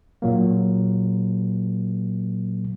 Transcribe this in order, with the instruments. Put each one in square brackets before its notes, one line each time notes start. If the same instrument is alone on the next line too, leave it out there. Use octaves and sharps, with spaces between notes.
[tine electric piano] A#2 F#3 A#3